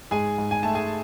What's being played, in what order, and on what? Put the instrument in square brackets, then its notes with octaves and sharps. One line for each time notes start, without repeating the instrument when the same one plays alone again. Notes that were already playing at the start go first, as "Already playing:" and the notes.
[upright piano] G#2 G#4 G#5
G#2
G#5
A3 A5
G#4 G#5